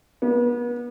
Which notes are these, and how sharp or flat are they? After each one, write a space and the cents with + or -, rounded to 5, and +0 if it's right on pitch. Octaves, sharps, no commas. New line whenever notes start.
B3 -40